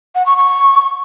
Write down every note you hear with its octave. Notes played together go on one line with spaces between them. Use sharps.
F#5
C#6
C#6